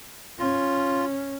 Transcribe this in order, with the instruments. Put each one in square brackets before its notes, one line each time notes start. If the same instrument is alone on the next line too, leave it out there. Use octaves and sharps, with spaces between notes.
[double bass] C#4 [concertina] F4